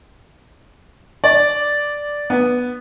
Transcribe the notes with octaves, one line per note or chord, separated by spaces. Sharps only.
D5
B3